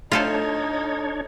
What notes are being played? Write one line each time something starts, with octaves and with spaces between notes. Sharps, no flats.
A3 D4 D#4 F4 A4 C5 C#5